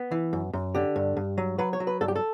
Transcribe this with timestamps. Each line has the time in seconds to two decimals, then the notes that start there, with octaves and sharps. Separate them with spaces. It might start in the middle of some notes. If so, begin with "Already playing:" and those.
Already playing: B3
0.12 E3
0.33 F#2
0.53 F#2
0.75 D3 G4
0.96 G2
1.17 G2
1.38 F#3
1.59 F#3 B4
1.73 C#5
1.80 F#3
1.87 B4
2.01 G2 A4
2.08 G4
2.16 A4